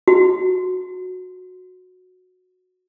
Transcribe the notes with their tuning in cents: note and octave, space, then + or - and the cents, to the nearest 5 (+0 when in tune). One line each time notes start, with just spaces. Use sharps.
F#4 -15